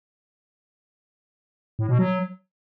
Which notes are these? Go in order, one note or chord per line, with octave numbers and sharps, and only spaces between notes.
A2
B2
F#3